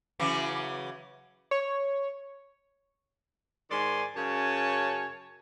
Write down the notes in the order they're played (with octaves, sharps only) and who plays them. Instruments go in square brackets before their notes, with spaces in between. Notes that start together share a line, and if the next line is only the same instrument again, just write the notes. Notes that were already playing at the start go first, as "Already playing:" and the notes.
[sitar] C#3 E3 F#3
[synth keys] C#5
[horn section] G#2 D#3 D5 G#5 C6
F#2 C#3 C#5 G#5 A5